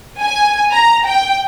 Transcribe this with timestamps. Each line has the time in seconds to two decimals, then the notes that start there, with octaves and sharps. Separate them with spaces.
0.20 G#5
0.72 A#5
1.05 G5